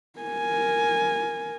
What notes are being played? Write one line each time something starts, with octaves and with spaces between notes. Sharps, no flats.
A#4 G#5